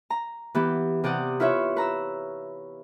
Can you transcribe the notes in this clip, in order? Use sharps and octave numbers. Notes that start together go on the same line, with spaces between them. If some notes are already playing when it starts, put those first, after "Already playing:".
A#5
E3 B3 G4
C3 G4 D5 F#5 D#6
E4 F4 B4 C#5 E5
B4 A#5 E6